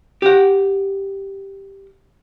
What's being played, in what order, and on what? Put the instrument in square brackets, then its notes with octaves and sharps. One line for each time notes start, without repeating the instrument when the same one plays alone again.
[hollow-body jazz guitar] G4 F#5